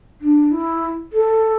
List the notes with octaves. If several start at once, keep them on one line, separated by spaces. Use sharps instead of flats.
D4
E4
A4